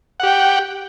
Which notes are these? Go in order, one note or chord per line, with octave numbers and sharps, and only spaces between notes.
G4 F#5 G5